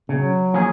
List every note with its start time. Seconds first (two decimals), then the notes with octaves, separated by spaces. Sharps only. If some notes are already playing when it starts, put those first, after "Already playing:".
0.09 C#3 F#3
0.54 F3 A#3 C#4 G#4